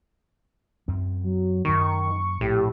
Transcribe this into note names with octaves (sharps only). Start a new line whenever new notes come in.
F#2 C4
F#3
F#2 D#3 A#3 C#6
A#1 A2 G4